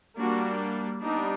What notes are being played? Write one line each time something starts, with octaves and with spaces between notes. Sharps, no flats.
G3 A#3 D4 F#4
G3 B3 D4 D#4